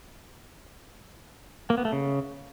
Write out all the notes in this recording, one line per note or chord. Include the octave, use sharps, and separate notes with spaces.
A#3
B3
A3
C#3